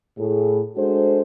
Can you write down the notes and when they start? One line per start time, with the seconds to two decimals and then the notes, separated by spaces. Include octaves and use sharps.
0.18 A2 G#4
0.76 G#3 D4 F#4 A4 C5